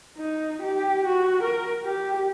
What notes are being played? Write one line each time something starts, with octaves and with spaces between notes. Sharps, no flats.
D#4
G4
F#4
A#4
G4